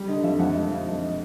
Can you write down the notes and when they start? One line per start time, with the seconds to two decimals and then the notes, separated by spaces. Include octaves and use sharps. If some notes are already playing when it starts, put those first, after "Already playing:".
Already playing: G3
0.08 D3 D#5
0.23 F2 E5
0.39 F2 F#5
0.55 G3 E5
0.71 D3 F5
0.87 F2 D#5
1.02 D#5